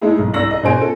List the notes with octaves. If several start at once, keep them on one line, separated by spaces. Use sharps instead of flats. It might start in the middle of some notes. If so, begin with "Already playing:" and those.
G#3 A3 D#4 E4 G#4
B1
C2 D5 E6 A#6 F#7
D#5
B2 C#4 G#4 C5 G#5 D7
F4 A4